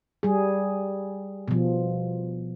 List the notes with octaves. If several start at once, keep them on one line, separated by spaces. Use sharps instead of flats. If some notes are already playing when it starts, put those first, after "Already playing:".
G3 G#4
B2 F3